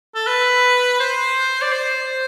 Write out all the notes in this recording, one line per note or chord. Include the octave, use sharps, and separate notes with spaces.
A4
B4
C5
D5
C5